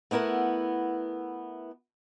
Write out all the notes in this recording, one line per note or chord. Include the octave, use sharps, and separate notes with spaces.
A3 B3 E4 A#4 F#5